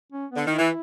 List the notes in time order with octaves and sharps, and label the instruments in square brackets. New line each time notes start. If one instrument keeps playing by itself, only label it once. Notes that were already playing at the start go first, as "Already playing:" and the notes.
[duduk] C#4
B3
[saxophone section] D3
[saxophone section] D#3 [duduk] E4
[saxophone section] E3